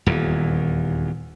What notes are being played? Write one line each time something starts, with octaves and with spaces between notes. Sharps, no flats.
D#1 E2